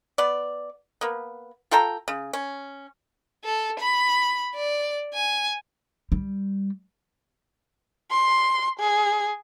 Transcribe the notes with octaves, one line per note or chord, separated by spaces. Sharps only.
B3 D5
A#3 B3
F4 A4 G5 A#5
C#3
C#4
A4
B5
D5
G#5
G3
C6
G#4